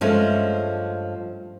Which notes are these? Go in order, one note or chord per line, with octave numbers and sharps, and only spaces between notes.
G2 F3 G#3 A3 C#4